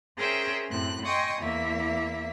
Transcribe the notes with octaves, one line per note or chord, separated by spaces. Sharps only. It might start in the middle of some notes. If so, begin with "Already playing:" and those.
C#4 G#4 A#4 C5 E5 G5
F#2 A2 C4 F#6
D#5 G5 G#5 C6 C#6 D#6
E2 A#3 E4 E5